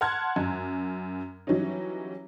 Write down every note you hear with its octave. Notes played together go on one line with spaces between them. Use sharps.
F#5 A5 C6 F6 F#6 G#6
F#2
E3 F#3 G3 C#4 D#4